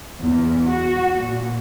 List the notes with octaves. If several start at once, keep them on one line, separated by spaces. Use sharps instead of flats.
E2
F#4
A#2